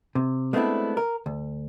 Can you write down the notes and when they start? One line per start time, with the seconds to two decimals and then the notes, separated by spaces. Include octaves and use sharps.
0.15 C3
0.53 G#3 A3 B3 C4 D4 E4
0.97 A#4
1.26 D2